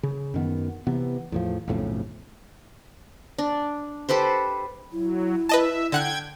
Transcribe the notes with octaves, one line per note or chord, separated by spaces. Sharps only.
C#3
F#2 D#3 B3
C3 E3 B3
E2 A2 F3
B1 F2 A2 C#3
D4
G4 A4 B4 C5
F#3 E4
B4 D#5 E5 A5
D3 F#5 G5 F#6 G#6